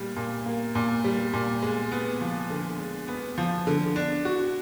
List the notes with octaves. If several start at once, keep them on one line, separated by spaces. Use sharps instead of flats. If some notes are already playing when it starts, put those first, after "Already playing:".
Already playing: A#2 G3
A#2
A#3
A#2
G3
A#2
G#3
B3
F3
D3
G#3
B3
F3
D3
D4
F#4